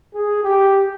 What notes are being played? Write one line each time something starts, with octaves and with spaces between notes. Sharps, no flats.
G#4
G4